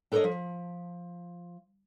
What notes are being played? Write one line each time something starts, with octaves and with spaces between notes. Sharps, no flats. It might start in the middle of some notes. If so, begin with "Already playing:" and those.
D4 A4 A#4 C5 C#5 D#5
F3